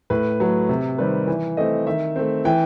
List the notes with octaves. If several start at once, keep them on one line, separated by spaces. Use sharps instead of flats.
A2 B4
F#3 A3 B4
C3
D#3 G3 C4 B4
E3
A3 C4 D#5
D#3 E5
A3 C4
E3 G5